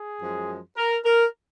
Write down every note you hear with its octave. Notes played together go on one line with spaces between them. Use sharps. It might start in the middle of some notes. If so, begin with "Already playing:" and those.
Already playing: G#4
F#2 F3 G#3
A#4
A#4